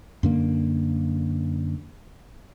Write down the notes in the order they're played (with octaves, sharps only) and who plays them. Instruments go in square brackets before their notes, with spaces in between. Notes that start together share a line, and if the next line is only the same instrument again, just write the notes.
[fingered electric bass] F#2 D3 A#3